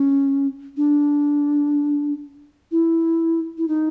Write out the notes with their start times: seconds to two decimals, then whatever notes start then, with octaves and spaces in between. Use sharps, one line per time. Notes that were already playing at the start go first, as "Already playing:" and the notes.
Already playing: C#4
0.77 D4
2.72 E4
3.58 E4
3.68 D#4